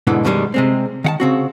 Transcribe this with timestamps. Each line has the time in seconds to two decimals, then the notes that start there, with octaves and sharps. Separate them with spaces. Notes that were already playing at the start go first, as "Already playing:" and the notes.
0.07 E2 G#2 B2 D3 E3
0.25 F#2 B2 D#3 E3 G3 G#3
0.54 C3 G#3 C4
1.04 D#3 F#5 A5
1.20 C#3 C4 F#4